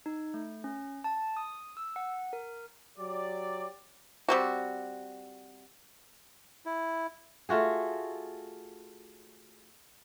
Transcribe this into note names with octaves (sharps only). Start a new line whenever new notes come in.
D#4
A3
C#4
A5
D#6
E6
F#5
A#4
F#3 G4 D5
G3 C4 F#4
E4
A3 F4 F#4 G#4